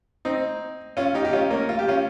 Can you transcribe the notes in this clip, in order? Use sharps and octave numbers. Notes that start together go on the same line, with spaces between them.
C4 D#4
C#4 F4
D#4 G4
G4
C#4 F4
A#3 C#4
F4
G4
C#4 F4